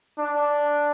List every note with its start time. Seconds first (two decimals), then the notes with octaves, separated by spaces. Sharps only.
0.19 D4